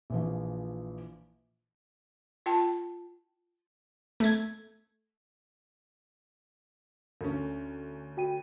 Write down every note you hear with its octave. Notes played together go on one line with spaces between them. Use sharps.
A#1 E3 F3
F4 G5 A5
A3 G#6
D2 C#4
F#4 G5 D#7